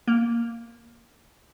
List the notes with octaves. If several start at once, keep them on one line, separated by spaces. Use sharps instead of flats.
A#3